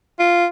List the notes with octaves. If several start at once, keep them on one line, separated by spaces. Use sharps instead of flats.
F4